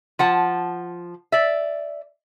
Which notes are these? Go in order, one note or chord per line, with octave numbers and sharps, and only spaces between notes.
F3 F#5 A5
D5 E5